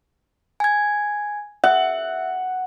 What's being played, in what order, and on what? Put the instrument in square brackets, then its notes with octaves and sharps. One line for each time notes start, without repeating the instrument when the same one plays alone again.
[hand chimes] G#5 G#6
[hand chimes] E5 [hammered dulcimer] F#5